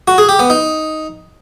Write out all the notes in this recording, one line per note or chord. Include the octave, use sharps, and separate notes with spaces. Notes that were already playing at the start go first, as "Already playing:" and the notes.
F#4
G#4
G4
B3
D#4